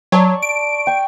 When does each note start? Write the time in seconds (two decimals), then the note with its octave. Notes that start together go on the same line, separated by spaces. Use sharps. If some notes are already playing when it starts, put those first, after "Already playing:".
0.12 F#3 D5 A5 C#6
0.42 D7
0.87 G5 C#6